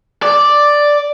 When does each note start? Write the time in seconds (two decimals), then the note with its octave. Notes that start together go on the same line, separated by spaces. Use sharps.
0.23 D5